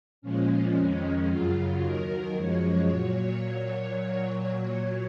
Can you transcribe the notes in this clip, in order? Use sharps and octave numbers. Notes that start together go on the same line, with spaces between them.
A#2 F3 G#3 C#4
F2 D#3 G#3
F#2 C#3 F#3 F4
D#2 D#3 F#3 A#4
F#2 F3 G#3 C#5
A#2 F#3